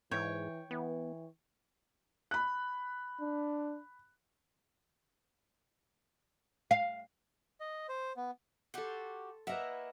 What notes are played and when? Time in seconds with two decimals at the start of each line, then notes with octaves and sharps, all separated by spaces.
0.11 G#2 E3 C#5 G5
0.71 E3 B3
2.31 B5 F#6
3.21 D4
6.71 F5
7.60 D#5
7.89 C5
8.17 B3
8.74 F#4 G4 A4 C6
9.47 A#3 E4 B4 D#5 E5 F#5 A#5